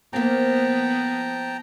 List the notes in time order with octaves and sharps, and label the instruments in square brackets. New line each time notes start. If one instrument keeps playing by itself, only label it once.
[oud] F3 A#3 [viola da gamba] B3 [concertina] G5 A5 A#5